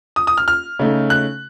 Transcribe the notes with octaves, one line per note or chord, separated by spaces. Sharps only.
D#6
D#6
F6
F6
C#3 A3 D#4
F#6